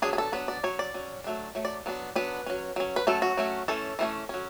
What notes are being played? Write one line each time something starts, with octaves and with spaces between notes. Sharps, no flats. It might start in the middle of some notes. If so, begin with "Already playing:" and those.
F#3 B3 D4 G#4
G#4
A4
F#3 B3 D4 B4
D5
F#3 C#4 C#5
D5
F#3 C#4
F#3 A3 D4
F#3 A3
D5
F#3 B3 D4
F#3 B3 D4 B4
F#3 C#4
F#3 C#4
B4
F#3 A3 C#4 A4
F#4
F#3 A3 C#4
E3 A3 C#4 A4
E3 A3 C#4
F#3 C#4